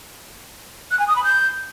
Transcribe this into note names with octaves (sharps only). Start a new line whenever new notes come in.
F#6
G#5
D#6
B5
G6